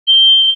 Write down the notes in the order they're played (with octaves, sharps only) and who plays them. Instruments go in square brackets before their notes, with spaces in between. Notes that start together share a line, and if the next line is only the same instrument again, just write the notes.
[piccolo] G7